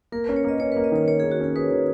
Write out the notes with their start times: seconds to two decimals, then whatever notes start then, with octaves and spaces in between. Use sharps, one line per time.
0.12 A#3 A#4
0.24 B4
0.29 C#4
0.36 C#5
0.44 A#3 D#5
0.60 C#4 C#5
0.72 B4
0.76 A#3
0.84 D#5
0.92 D#3 C#5
1.08 A#3 C#5
1.20 G#4
1.24 D#3
1.32 F#4
1.40 C#4 G#4
1.55 G#4 B4
1.71 D#3